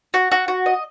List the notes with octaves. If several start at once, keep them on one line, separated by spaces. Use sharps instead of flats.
F#4
F#4
F#4
D#5